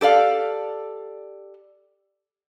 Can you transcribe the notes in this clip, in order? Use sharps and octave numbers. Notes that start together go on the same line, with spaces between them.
G4 A4 D5 F5